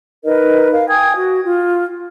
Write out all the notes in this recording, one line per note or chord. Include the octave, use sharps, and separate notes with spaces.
D#4 A#4 B4 D#5
A#4 F5
G5 G#5 D#6 G#6
F#4
F4